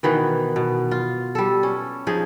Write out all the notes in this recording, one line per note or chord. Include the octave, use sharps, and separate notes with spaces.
B2 D#3 E3 B3
B2
F4
G3 A4
C#4
F3 D#4 G#4